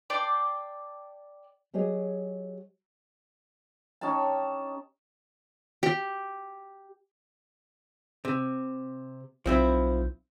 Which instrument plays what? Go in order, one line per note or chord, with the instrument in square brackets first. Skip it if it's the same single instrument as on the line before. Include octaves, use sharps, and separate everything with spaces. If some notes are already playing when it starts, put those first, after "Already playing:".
[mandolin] D5 G5 A5 C6
[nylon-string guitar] F#3 G4 G#4 C#5 D#5
[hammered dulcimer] C#4 D#4 G4 A5
[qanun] G4
[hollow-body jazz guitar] C3
[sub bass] B1 [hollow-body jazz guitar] F3 C4 E4